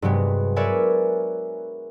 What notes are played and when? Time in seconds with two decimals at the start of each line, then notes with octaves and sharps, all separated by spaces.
0.02 G2 C3 F#3 G#3 B3
0.56 A#4 B4 C#5 D5 E5 G#5